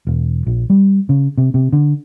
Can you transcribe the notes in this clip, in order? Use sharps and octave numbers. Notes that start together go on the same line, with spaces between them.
E1
A#1
G3
C#3
C3
C3
D3